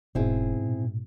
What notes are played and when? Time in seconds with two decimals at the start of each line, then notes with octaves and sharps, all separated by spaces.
0.15 E1 G#2 B2 C4 E4 G#4
0.62 A#2